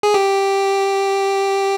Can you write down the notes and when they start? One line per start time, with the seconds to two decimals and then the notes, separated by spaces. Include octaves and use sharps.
0.03 G#4
0.14 G4